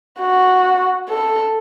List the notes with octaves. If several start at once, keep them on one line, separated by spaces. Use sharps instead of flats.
F#4
A4